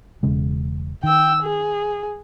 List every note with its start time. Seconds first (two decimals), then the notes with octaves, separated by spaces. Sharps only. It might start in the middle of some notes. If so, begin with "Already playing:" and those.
0.23 E1 C#3 G#3
1.04 D#3 G5 E6
1.43 G#4